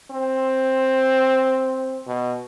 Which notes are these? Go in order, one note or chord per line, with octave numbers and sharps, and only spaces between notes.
C4
B2